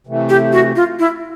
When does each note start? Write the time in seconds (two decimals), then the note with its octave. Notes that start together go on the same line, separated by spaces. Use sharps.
0.07 C3 E3 A3
0.29 G4
0.53 F#4
0.76 F4
0.99 E4